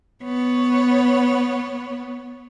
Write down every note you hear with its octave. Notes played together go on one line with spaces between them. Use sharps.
B3 C#5